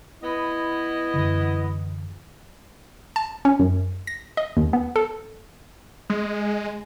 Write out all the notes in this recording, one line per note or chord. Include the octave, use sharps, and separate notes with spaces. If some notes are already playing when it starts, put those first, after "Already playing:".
B3 E4 D#5
F#2 D3 E3
A5
C#4
F#2
A#6
D#5
D#2
B3
A4
G#3